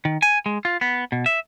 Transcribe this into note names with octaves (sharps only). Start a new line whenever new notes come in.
D#3
G#5
G#3
F4
B3
B2
E5